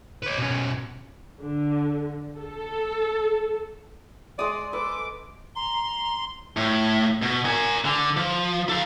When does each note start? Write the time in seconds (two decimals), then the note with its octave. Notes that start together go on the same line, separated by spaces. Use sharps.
0.23 B4 C#5
0.39 B2 C#4
1.42 D3
2.38 A4
4.39 G#3 D5 C6 D#6
4.73 A4 B4 D6
5.55 A#5 C6
6.57 A2
7.22 B2
7.45 A#4 G#5
7.85 D3
8.17 F3
8.69 A4 F5